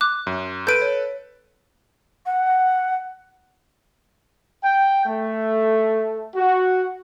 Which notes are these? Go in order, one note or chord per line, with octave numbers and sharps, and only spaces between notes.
D6 F#6
F#2
A4 B4 G6 D7 D#7
C#5
F#5
G5
A3
F#4